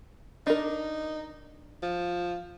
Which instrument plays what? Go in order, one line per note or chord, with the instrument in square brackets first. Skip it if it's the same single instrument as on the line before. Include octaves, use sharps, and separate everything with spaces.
[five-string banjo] D4 A#4 [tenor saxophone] D#4
[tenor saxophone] F3